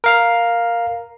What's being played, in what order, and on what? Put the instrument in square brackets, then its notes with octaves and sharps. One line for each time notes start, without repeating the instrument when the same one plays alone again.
[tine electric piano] A#4 F5 F6